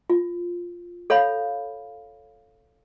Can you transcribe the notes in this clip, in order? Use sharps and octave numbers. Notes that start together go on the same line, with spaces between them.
F4
A4 C#5 F5 B5